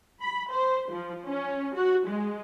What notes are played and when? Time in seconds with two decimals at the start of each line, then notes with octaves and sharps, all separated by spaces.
0.21 B5
0.52 C5
0.90 F3
1.28 C#4
1.75 F#4
2.07 G#3